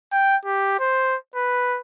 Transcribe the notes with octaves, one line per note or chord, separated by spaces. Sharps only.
G5
G4
C5
B4